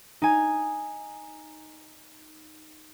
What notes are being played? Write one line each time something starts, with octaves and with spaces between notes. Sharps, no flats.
D#4 G#5